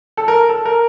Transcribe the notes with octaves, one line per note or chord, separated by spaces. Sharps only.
A4
A#4
A4
A#4